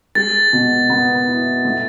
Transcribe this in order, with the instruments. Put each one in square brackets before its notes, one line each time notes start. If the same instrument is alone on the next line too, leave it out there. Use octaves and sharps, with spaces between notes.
[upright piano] G#3 [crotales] A6
[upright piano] B2
B3
E4
A2